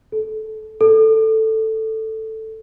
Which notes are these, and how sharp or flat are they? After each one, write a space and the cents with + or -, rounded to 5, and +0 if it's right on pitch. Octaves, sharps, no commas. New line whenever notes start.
A4 -15
A4 +5